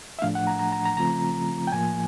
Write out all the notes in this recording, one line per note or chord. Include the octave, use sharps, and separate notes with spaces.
E5
A2 F3 A3 D4 F5
F#5
A#5
A#5
A#5
A#5
C#3 F3 A3 C4 F4 A#5
G5
A2 F3 A#3 G#5